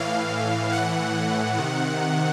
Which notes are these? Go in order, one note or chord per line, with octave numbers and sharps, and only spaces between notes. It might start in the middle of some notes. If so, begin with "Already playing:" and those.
Already playing: A2 E3 F5
F#5
C3 D#3